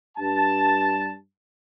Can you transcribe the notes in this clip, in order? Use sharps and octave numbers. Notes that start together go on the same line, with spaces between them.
G2 A5